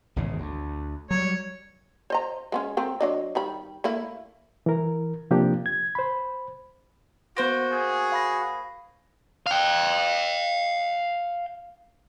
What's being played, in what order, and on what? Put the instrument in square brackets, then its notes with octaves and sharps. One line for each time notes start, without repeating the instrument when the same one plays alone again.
[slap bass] G#1 E2 C#3
D2
[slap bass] F#3 G3 [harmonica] C#5
[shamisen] C5 D#5 A#5
G#3 B3 C#4
A3 C4 A#4
F#3 D4 D#5
D#3 G3 B5
A3 A#3 E4
[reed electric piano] E3 A#4
C3 F3 A#3 D4 G4
G#6
C5 B5
[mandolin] A#3 C5 [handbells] B3 A#6 [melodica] F#4
[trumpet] G#4 [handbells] G6
[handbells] F5 B5 A#6
[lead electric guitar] F5 G5